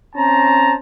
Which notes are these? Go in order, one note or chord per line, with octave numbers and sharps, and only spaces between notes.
C4 C#4 C5 A5 A#5